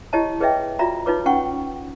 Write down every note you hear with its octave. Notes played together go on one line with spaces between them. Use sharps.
E4 G4 C#5 D#5 A5
G#4 B4 C#5 D#5 E5 G5
F4 F#4 D5 E5 A#5
D#4 F4 B4 C#5 D6
C#4 F#5 G5 C#6